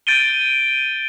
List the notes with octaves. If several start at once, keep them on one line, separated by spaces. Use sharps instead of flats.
G6 A6 D7 D#7 G7